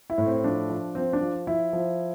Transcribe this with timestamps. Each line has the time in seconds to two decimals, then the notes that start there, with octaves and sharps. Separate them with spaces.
0.10 E4
0.18 A2
0.26 C4
0.44 F3 D4
0.70 F3
0.95 F3 C4
1.13 D4
1.21 F3
1.47 F3 E4
1.73 F3